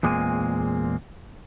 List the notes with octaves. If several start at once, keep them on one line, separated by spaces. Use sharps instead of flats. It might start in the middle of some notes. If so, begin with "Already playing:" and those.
E2 A#2 G#3 A#3 C4 G#5